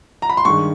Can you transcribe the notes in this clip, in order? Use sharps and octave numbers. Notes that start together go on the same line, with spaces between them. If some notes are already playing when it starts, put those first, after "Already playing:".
A#5
B5
C6
G2 D#3 G#3 C#6